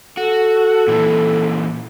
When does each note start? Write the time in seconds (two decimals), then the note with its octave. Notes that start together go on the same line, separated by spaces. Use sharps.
0.17 F#4 A4
0.88 A#2 E3